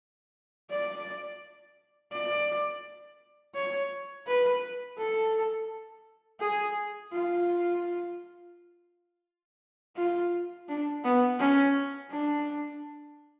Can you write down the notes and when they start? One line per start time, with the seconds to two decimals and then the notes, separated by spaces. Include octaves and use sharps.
0.70 D5
2.13 D5
3.55 C#5
4.27 B4
4.98 A4
6.40 G#4
7.12 F4
9.97 F4
10.69 D4
11.05 B3
11.39 C#4
12.11 D4